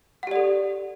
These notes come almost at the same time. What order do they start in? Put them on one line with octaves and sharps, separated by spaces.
F#5 G4 D5 A4